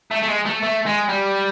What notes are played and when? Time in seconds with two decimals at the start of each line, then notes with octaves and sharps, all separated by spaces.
0.11 A3
0.22 A3
0.28 G#3
0.45 A3
0.63 A3
0.86 G#3
1.09 G3